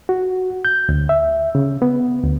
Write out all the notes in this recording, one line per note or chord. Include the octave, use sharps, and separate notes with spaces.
F#4
G6
D2
E5
C#3
B3
D2